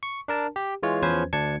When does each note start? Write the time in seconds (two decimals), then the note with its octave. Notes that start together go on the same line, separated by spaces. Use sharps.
0.03 C#6
0.28 D4 A#4 A5
0.56 G4
0.83 E3 G#3 F4 C#5
1.02 E2 F3 C#4 B4 C5 G#6
1.33 D2 D4 A5 G#6 C#7